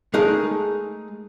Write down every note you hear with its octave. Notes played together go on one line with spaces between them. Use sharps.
G#3 A3 D#4 G#4 A#4